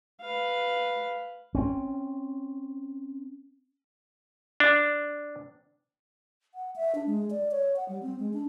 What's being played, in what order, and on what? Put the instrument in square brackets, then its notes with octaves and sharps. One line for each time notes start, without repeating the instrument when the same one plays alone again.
[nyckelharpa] B4 F5
[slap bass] C4 C#4
[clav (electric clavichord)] D4
[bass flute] F#5
E5
D4
G#3
D5
C#5
F#5
G3
C4
G#3
D4